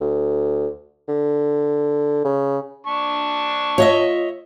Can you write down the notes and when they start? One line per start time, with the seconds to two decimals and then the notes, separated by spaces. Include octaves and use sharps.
0.01 D2
1.08 D3
2.25 C#3
2.87 D4 A5 C#6
3.78 F4 C#5 D#5 E5